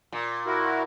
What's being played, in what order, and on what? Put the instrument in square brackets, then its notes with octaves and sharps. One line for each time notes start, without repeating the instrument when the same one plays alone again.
[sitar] A#2
[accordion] E4 F#4 A#4